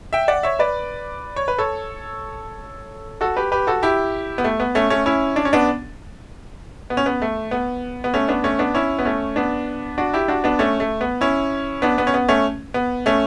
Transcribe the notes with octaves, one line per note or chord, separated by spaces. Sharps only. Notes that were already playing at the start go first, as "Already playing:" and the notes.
E5 G5
D5 F#5
C#5 E5
B4 D5
C#5
B4
A4 C#5
F#4 A4
G4 B4
G4 B4
F#4 A4
E4 G4
B3
A3
B3
A3 C#4
A3 C#4
C#4 E4
D4
C#4
B3 D4
B3
C#4
B3
A3
B3
B3
A3 C#4
B3 D4
A3 C#4
B3 D4
C#4 E4
B3
A3 C#4
B3 D4
D4 F#4
E4 G4
D4 F#4
B3 D4
A3 C#4
A3
B3
C#4 E4
B3 D4
B3
C#4
B3
A3 C#4
B3
A3 C#4